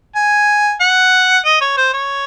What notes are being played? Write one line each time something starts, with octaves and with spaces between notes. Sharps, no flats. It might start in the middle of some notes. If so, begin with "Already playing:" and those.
G#5
F#5
D#5
C#5
C5
C#5